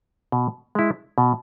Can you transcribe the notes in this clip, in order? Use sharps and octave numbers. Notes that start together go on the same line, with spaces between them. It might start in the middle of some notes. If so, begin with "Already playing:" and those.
B2
G#3 E4
B2